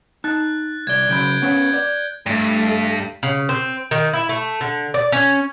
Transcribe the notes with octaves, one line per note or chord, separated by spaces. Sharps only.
D#4 A5 F#6 A6
C2 D5 G#6 G7
C#3 F#3 B5 G6 D7 F#7
B3 C#4 B4
D5
G2 A3
C#3
C4
D#3
E4
A3
D3
D5
C#4